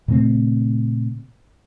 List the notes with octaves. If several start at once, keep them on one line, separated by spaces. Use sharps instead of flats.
A#2 C#3 A3 C4